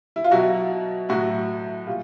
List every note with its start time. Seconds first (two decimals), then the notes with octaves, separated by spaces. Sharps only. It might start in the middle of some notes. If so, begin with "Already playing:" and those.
0.16 E4
0.24 F4
0.31 B2 F#3 E4 F#4
1.09 A2 F#3 E4 F#4
1.87 A#2 G3 F4